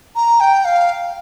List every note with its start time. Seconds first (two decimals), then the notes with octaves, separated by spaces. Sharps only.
0.16 A#5
0.40 G5
0.65 F5